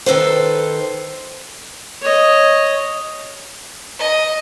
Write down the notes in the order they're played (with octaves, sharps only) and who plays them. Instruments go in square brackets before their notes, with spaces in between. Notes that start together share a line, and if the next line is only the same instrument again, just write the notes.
[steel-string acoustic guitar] D#3 A4 B4 C5
[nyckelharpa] C#5 D#5
[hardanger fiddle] D#5